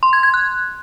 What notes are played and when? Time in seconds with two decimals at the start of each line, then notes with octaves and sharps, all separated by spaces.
0.03 C6
0.13 G#6
0.23 G#6
0.34 F#6